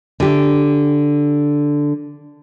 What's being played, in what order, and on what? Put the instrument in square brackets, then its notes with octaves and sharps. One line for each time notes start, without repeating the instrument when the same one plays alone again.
[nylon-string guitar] D3 G4